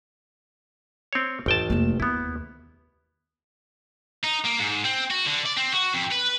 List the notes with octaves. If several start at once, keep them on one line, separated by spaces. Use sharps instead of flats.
C4 C#5
G#1 E2 G5 A5
F1 A#3
D#2 B3 E4
D#4
A#3
G#2
C4
F#4
D3
D5
C4
F#4
F2
B4